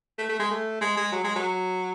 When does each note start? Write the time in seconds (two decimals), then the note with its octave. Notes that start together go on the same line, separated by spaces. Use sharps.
0.18 A3
0.29 A3
0.39 G#3
0.50 A3
0.81 G#3
0.96 G#3
1.12 F#3
1.24 G#3
1.35 F#3